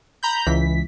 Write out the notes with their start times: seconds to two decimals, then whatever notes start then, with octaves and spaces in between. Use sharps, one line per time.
0.23 A#5 B5 G6
0.46 C#2 E3 B6